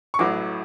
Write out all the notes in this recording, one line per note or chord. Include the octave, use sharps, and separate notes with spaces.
C#6
A1 A2 F#3 D6